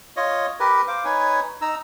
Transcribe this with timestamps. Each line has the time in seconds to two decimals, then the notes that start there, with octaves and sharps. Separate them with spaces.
0.17 F4 C#5 D#5
0.60 G4 A#4 B4
0.88 C5 F5 D6
1.05 D#4 B4 C#5 G#5
1.62 D#4 A#5 E6